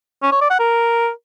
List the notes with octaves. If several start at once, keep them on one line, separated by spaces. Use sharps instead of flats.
C#4
C#5
D5
F#5
A#4